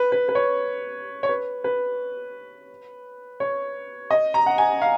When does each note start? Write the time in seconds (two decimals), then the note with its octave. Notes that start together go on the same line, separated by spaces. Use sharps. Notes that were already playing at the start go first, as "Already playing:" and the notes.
Already playing: B4
0.12 B4
0.29 B4
0.35 C#5
1.23 C#5
1.29 B4
1.64 B4
3.40 C#5
4.11 D#5
4.34 A#5
4.46 F#5
4.58 G#5
4.82 F5